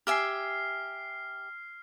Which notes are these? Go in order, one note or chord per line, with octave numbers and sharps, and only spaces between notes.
G4 E5 G#5 F6 C7